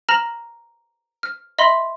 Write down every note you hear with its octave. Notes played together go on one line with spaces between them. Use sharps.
A#5 F6 A#6 E7 F#7
F6
D#5 E5 B5 C6